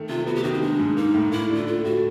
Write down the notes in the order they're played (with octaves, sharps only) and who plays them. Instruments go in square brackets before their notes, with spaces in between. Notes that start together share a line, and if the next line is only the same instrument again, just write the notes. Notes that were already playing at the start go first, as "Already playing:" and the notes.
Already playing: [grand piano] D#3 A3
[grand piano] C3 [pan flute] F4
[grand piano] B3 [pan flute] F#4
[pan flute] G4
[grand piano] D#3 [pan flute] F#4
[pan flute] C#4
[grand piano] G#3 [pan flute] D4
[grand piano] G#2
[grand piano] A#3 [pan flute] D#4
[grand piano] A2
[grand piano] A#3 [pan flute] E4
[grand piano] D3
[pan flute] F4
[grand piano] A3 [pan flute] F4
[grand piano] A2 [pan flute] F#4